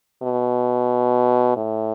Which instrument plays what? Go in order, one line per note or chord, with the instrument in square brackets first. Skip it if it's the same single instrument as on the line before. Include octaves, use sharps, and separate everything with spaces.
[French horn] B2
A2